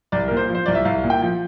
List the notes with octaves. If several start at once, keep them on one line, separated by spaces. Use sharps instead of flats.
C2 D5
A#2 A#4
C5
F3
C5
C2 D5
E5
C2 F5
A#2
G5
F3